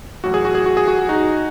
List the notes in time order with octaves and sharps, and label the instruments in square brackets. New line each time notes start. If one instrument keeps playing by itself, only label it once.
[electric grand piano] A1 A2 F#3 F#4
G#4
F#4
G#4
F#4
G#4
F#4
G#4
D#4 F#4